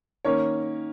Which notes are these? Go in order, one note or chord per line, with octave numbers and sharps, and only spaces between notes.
D#3 A#3 C#4 C#5